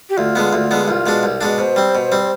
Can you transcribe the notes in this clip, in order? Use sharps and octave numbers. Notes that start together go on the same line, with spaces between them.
G4
D2 F4
D3 G#3 B3
D2
D3 G#3 B3
G4
C2 F4
B2 G#3 D4
C2
B2 G#3 D4
B2 C5
G3 C4
B2
G3 C4